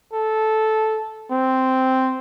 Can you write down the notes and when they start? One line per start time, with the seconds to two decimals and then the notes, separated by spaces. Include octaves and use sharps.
0.13 A4
1.31 C4